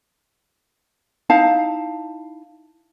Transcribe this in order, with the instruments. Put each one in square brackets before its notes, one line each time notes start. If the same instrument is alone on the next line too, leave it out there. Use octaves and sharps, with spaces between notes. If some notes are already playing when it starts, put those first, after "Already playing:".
[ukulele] D#4 E4 F5 A5